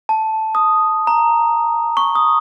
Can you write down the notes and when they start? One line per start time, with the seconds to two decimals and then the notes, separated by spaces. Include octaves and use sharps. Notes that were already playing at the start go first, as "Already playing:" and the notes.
0.09 A5
0.55 D#6
1.07 A#5
1.97 C#6
2.16 D#6